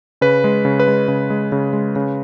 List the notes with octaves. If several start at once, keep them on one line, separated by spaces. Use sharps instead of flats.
C#3 B4
G#3
C#3
B4
G#3
C#3
G#3
C#3
G#3
C#3